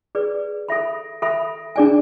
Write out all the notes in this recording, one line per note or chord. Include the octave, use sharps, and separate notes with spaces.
G#4 B4 D5
A4 E5 B5
A4 E5 B5
D4 G#4 D5 G#5